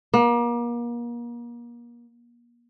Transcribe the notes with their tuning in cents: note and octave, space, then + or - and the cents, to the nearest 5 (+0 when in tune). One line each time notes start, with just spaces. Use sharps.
A#3 +35